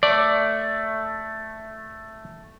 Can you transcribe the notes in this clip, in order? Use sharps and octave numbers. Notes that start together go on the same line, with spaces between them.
A3 D5